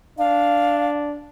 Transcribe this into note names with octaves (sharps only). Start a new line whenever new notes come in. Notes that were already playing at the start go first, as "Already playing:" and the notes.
D4 F5